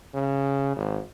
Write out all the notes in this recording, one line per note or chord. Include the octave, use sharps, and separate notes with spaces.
C#3
G#1